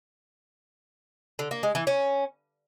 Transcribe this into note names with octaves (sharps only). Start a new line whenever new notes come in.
D3
A#3
G#3
E3
C#4